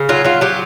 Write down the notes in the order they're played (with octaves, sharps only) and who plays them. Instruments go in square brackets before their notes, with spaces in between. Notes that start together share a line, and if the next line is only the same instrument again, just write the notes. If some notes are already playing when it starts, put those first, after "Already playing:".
Already playing: [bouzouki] C#3
F#3 F4
F#3 F4
F#3 G4